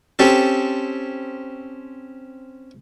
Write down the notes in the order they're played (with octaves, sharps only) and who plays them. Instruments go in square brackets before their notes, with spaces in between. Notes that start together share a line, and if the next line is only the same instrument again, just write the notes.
[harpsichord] C4 C#4 G4 A4